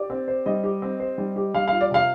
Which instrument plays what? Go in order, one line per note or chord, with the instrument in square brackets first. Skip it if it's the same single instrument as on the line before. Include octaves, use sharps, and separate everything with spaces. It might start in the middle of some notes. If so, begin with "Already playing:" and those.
Already playing: [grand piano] G4 [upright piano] D5
[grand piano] C4
C5
[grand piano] G3 [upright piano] D#5
[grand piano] G4
C4
C5
G3
G4
[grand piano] G3 [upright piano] F5
[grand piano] F4 [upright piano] F5
[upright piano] D5
[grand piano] C3 [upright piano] F5